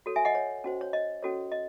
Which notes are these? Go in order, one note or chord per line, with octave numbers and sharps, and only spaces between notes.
F#4 A4 C#5
E5 G#5
D#5 F#5
C#5
C#4 F#4 C5
C#5
D#5
C#4 F#4 A4 C#5
D#5